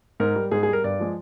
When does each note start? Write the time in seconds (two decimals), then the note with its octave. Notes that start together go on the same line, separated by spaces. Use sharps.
0.20 G#2 A#4
0.35 G3
0.51 G#2 G#4
0.63 G#4
0.68 G3
0.73 A#4
0.84 G2 D5
0.99 F3 G#3